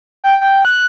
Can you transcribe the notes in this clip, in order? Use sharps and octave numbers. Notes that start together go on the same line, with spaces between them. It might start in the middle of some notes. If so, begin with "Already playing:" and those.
G5
G5
F#6